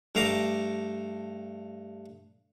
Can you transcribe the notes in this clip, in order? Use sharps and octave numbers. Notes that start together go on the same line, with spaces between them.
G2 A3 F5 A#5 D6